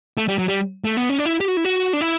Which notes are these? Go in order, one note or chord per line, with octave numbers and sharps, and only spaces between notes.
A3
G3
F#3
G3
A3
B3
C#4
D4
E4
G4
F#4
E4
F#4
D4
E4